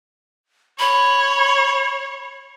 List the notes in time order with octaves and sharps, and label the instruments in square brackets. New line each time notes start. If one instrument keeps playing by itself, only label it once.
[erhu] C#5 [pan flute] B5